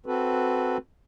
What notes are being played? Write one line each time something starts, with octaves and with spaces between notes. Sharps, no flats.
C4 F#4 A4 B4